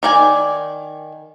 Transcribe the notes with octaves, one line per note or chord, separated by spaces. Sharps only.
D#3 D5 G#5